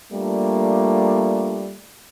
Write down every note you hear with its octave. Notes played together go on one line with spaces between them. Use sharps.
G3 A3 A#3 D4 F4